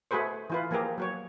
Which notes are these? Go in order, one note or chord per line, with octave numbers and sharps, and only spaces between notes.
A3 F#4 G#4 B4 C5
E3 F4 B4
F3 A#3 G4 G#4 A#4
F#3 F#4 C#5